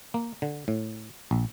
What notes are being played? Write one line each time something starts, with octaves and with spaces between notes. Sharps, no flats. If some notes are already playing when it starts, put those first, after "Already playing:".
A#3
D3
A2
A#1